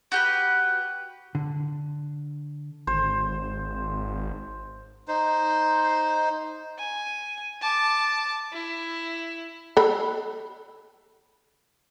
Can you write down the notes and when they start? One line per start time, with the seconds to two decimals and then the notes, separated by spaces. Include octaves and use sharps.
0.12 F#4 G4 B4
1.35 D3
2.87 G#1 C5
5.08 D#4 C5
6.78 G#5
7.61 A5 D6
8.53 E4
9.77 A4 B5